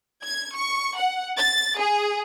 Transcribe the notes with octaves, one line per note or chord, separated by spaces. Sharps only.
G#6
C#6
F#5
A6
G#4